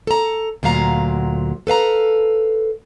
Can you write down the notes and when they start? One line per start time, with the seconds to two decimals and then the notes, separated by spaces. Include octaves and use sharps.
0.07 A4 A#5
0.63 D2 A#2 F#3 F5 A#5
1.67 A4 B4 F5 A#5